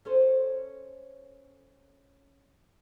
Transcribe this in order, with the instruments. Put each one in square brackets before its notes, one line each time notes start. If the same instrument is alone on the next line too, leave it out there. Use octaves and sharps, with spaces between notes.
[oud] C#4 A4 C5